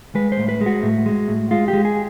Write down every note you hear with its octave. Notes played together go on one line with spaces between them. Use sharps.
G#3 B4
C5
A2
B4
G#3
F#4
A2
G#3
A2
G#3 F4
G4
G#3
G#4